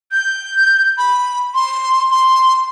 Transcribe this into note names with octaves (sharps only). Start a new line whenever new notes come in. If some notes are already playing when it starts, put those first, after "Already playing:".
G6
B5
C6
C6